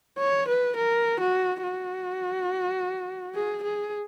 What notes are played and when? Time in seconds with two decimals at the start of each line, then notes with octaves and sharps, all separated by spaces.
0.19 C#5
0.48 B4
0.76 A#4
1.20 F#4
1.63 F#4
3.35 G#4
3.63 G#4